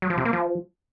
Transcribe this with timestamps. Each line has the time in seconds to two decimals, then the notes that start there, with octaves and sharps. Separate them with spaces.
0.02 F#3
0.10 F3
0.18 C3
0.25 A#3
0.33 F3